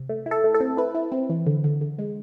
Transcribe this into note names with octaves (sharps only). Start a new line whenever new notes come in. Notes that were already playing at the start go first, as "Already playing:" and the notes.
Already playing: C3
A3
E4
A4
A3
A4
C4
E4 B4
E4
C4
E3
D3
D3
D3
G#3